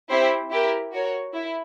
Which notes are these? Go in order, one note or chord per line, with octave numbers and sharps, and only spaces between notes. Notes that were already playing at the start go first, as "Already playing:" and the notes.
C4 E4 G4 C5
E4 G4 A#4
F#4 A#4 C#5
E4